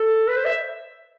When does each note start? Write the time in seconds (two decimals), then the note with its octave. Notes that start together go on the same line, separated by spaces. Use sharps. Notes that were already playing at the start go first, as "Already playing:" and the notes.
Already playing: A4
0.27 B4
0.36 C5
0.45 E5